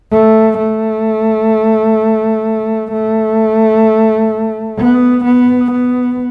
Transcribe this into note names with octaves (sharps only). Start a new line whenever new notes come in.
A3
A3
A3
B3
B3
B3